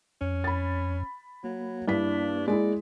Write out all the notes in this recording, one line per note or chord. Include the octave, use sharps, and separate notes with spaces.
F2 C#4
B5 A6
F#3 A#3
G2 D4 E4 B6
G#3 E4 D5